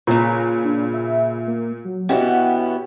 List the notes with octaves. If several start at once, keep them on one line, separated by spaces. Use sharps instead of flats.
A#2 C#3 B4 C#5 A#5
D4
E5
A#3
F#3
B2 E3 B3 C#4 G4 F#5